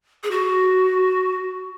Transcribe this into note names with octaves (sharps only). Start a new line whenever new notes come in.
G#4
F#4